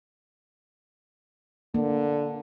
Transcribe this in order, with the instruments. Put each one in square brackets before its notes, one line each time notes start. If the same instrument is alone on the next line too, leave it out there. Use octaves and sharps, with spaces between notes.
[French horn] D3 [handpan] A#3